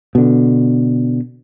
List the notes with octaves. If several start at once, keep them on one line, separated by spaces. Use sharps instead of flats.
B2 D3